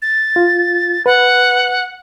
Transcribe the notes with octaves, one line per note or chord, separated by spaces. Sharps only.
A6
F4
B4 F#5